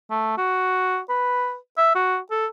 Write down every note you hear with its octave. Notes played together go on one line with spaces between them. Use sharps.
A3
F#4
B4
E5
F#4
A4